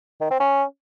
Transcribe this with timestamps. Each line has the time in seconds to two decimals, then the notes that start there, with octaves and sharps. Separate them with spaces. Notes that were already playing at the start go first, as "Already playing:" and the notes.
0.21 D#3
0.31 C4
0.40 C#4